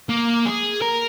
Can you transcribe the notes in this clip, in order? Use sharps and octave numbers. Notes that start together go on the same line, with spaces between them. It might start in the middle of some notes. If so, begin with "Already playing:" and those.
A#3
G#4
A#4